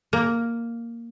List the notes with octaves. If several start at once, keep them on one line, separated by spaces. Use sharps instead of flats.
A#3